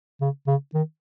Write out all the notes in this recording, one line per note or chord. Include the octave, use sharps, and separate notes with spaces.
C#3
C#3
D#3